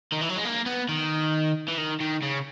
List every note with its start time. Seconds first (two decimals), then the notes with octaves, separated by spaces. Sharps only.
0.12 D#3
0.21 E3
0.29 F#3
0.36 G#3
0.45 A#3
0.66 B3
0.89 D#3
1.68 E3
1.77 D#3
2.00 D#3
2.22 C#3